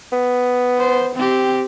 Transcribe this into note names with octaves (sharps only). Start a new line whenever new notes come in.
B3
C5
C4 G4